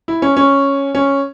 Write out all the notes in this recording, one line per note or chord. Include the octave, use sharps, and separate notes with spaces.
E4
C#4
C#4
C#4